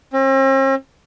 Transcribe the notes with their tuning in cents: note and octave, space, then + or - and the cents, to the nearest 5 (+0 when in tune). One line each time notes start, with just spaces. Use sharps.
C4 +45